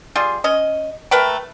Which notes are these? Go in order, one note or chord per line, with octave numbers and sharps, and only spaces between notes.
G3 F4 G#4
C#4 D#5
A3 A#4 B4 G5